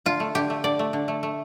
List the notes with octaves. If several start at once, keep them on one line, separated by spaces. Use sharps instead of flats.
D3 F4
A3
D3 G4
A3
D3 D5
A3
D3
A3
A3